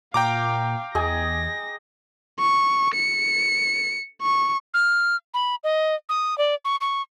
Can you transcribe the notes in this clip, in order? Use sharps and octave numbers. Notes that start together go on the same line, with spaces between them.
A#2 F5 G5 A#5 D6
E2 G#4 D#5 G#5 A#6
C#6
C#7
C#6
F6
B5
D#5
D#6
D5
C#6
C#6